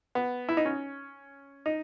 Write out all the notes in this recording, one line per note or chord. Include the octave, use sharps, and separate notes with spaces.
B3
E4
D#4
C#4
D#4